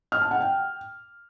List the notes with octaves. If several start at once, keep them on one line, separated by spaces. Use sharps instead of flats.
F6
A5
F#5
G5